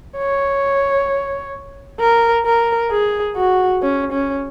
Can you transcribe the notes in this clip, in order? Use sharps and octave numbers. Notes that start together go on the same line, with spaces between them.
C#5
A#4
A#4
G#4
F#4
C#4
C#4